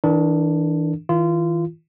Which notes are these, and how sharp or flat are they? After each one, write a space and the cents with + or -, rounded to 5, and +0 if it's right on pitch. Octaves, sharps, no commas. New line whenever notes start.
E3 -30 D4 +0 A4 +45
E3 -45 F4 -25